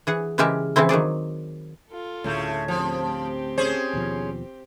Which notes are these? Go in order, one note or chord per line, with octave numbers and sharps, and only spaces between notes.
E3 G#4 F#5
C#3 E3 G#3 G4 A#4 E5
C#3 E3 F3 C4 E4
D#3 F#3 G#4 D5
F4 A4
D2 A2 C#3 A3
F3 C4 G4
C#4 G#4 C5
D#2 B2 F3